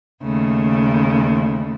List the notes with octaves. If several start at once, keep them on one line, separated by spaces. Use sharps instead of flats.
D#2 C#3 A3